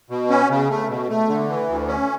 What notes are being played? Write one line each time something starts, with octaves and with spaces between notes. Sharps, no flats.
B2
C#4
C#3
A3
B2
A3
D3
E3
D2
C#4